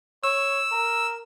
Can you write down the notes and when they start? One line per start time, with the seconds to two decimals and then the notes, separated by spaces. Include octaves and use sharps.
0.24 C#5 E6
0.72 A#4